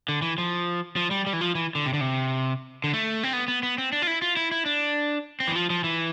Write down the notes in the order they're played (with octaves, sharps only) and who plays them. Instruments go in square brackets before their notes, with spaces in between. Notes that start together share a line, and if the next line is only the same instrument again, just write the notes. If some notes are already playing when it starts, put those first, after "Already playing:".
[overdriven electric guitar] D3
E3
F3
F3
G3
G3
E3
F3
E3
D3
C3
D3
C3
D3
A3
C4
B3
B3
B3
C4
D4
F4
E4
F4
E4
E4
D4
C4
E3
F3
F3
E3